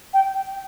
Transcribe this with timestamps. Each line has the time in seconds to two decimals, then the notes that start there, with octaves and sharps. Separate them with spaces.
0.14 G5